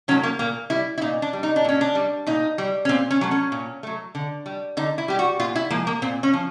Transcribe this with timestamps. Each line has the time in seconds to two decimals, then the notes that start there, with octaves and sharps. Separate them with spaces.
0.08 D#3 F#3 A3 C#4
0.23 A#3
0.39 A#2 A#3
0.70 G3 E4
0.98 E4
1.01 A#2 D#4
1.22 D4
1.33 G3
1.43 D#4
1.56 D4
1.65 A#2 C#4
1.81 D4
1.95 G3
2.26 A#2 D#4
2.58 G3
2.85 C#4
2.89 A#2 C4
3.11 C#4
3.21 F#3 A3
3.31 C#4
3.52 A#2
3.83 F#3 A3
4.15 D3
4.46 G3
4.77 D3 D#4
4.98 E4
5.08 G3 G4
5.19 F#4
5.39 A#2 F4
5.56 E4
5.70 F3 G#3 A#3
5.87 A#3
6.02 A#2 C4
6.23 C#4
6.33 F3